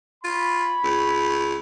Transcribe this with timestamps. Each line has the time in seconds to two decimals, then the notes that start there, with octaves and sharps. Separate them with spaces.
0.24 F4 C#5 B5
0.84 C#2